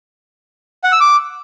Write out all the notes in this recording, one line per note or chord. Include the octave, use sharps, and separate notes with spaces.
F#5
E6
D6